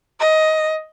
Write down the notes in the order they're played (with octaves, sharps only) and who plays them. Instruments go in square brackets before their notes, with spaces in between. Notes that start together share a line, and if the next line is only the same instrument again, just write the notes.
[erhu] D#5